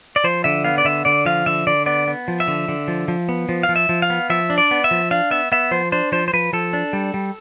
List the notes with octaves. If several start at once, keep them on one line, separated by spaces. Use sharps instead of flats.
D5
F3 C5
D3 E5
B3 F5
D5
D3 E5
D3 D5
F3 F5
D3 E5
D3 D5
B3 D5
B3
F3
E5
D3
D3
F3
F3
B3
F3
F5
F3
E5
F3
F5
B3
F3 E5
D4
D5
B3
E5
F3
D4 F5
B3 E5
B3 E5
F3 C5
D4 C5
F3 C5
C5
F3 B4
F3 A4
D4
G3
G3